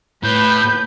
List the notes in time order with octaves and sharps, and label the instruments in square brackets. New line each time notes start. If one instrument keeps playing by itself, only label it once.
[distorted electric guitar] A2 [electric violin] B4 [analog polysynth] G6